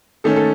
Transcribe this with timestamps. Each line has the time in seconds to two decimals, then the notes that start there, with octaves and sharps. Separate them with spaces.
0.24 D#3 A3 C#4 A4
0.36 A4